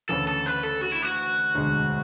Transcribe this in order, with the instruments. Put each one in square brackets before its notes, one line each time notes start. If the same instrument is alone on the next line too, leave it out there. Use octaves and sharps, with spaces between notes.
[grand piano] D2 C#3 E3 [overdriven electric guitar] A4
[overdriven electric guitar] A4
B4
A4
F#4
E4
F#4
[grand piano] E1 D2 D3 G#3